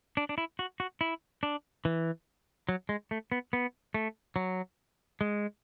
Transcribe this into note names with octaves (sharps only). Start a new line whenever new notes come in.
D4
D4
E4
F#4
F#4
E4
D4
E3
F#3
G#3
A3
B3
B3
A3
F#3
G#3